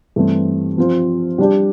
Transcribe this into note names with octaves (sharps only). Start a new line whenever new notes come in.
G2 E3 A3 C4
F3 C4 F4 C5
G3 D4 G4